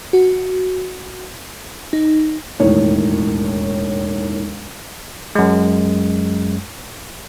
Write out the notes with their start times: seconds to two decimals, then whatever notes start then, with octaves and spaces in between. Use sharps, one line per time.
0.13 F#4
1.93 D#4
2.60 E1 D#2 A2 C#5
5.35 F#2 G#3